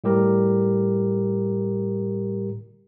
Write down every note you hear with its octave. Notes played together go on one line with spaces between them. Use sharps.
A2 G3 G4 A#4 A#5